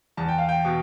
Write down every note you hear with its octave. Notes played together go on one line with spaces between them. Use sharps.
E2 A5
G5
F5
G5
B2